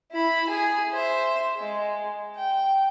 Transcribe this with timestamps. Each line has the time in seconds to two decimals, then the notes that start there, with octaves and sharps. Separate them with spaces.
0.11 E4 B5
0.50 G#4 G#5
0.92 C5 E5
1.57 G#3
2.37 G5